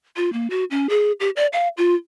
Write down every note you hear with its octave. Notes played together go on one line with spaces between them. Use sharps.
F4
A#3
F#4
C#4
G#4
G4
D5
F5
F4